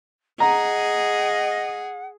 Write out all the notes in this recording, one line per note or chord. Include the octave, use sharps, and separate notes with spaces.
G#4 D#5 F#5 A#5